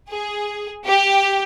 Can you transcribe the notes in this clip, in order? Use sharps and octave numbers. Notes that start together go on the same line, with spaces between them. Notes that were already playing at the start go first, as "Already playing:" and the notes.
G#4
G4